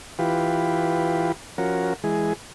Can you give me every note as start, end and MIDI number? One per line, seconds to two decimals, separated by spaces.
0.19 1.32 52
0.19 1.32 65
0.19 1.32 67
0.19 1.32 71
1.58 1.94 53
1.58 1.94 61
1.58 1.94 66
1.58 1.94 70
2.04 2.33 52
2.04 2.33 56
2.04 2.33 68